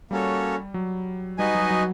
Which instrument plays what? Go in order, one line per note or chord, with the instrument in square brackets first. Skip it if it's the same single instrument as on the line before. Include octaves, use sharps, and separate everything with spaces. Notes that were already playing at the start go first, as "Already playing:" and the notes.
[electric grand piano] G3 [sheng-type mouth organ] A#3 C#4 F#4 A4 C#5
[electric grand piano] F#3
[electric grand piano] G3 [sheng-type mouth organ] D#4 F#4 B4 D#5 G#5
[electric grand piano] F#3
F#3